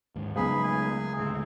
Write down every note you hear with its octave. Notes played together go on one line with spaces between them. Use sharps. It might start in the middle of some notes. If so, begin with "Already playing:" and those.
D#2 G#2
C#2 F#3 G3 B3 G#4 B5
A3 A#4 G#5
D2 A2 G#3 C4